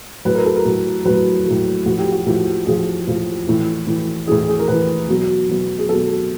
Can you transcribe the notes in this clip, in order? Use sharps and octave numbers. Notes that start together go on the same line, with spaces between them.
A2 F#3 B4
A#4
A4
A#4
A2 F#3
A2 F#3 B4
A2 F#3
A2 F3 F#4
G4
F#4
A2 F3
A2 F3 G#4
A2 F3
A2 E3
A2 E3
A2 E3 G#4
G#4
A#4
A2 E3 B4
B2 F#3
B2 F#3
G#4
B2 F#3 A4